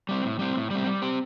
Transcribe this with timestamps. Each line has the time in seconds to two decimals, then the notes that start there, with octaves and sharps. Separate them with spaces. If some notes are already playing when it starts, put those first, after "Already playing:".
0.09 G3 C4
0.24 A2
0.39 G3 C4
0.56 A2
0.70 G3 C4
0.86 G3
1.02 C4 G4